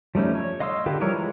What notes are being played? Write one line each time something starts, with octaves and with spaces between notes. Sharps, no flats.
F3 G3 A3 C#4 D#4
C#5
D#5 F5 C6 D#6 E6
D3 F4 G4 A4 B4
E3 F3 G3 A#4 C#5
G#3